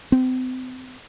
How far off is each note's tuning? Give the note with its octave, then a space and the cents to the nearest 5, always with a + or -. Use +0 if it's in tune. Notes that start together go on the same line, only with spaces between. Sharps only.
C4 -35